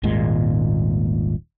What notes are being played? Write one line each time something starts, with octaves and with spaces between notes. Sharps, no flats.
D#1 G#1 A#2 G#3